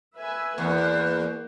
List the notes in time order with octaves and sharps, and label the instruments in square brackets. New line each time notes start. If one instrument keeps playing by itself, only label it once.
[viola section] B4 E5 G#5
[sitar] E2 [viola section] A#3